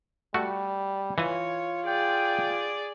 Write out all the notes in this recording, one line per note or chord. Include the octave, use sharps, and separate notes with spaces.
G3 A3 F#4
E3 F4 C#5 G#5
G#4 D5 G5